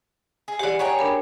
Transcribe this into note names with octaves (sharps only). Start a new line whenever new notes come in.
G#4
E3 G4 G#4 D5 F#5
G#4 C#5 F#5 G5 A#5 C#6
D4 A#4 B5